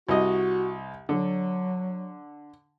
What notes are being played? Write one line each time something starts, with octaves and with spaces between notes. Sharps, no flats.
C2 F#4 D#5
D3 F#3